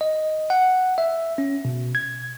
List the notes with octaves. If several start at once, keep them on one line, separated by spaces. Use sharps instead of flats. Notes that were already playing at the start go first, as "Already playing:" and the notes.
D#5
F#5
E5
C#4
B2
G#6